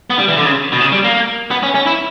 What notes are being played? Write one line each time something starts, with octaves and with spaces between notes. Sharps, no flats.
B3
G3
E3
D3
C#3
B2
C#3
G3
A#3
B3
C#4
C#4
E4